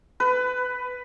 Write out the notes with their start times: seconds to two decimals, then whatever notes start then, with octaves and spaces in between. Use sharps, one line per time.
0.20 B4